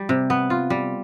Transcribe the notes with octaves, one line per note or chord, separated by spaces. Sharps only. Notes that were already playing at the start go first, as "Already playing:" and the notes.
Already playing: G3
C3
B3
F4
G3